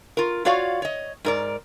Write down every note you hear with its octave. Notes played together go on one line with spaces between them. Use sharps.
F4 A#4
F4 F#4 C#5 D5 F5
C#5 D#5
G#2 A#4 D5